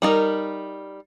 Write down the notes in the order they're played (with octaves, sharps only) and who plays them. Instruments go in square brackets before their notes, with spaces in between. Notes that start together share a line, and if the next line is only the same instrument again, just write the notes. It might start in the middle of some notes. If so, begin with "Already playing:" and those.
[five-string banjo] G3 D#4 A#4